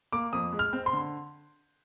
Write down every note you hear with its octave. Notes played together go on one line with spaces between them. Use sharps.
A#3 D6
F2 D#6
G#3
F6
C4
C6
D3